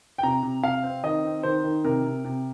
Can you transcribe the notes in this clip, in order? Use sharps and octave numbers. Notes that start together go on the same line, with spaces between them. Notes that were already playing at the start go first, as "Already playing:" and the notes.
G5
C3 A#5
C3
C3 F5
C4
D#3 D#5
C4
D#3 C5
D#3
C3 A#4
C3
C3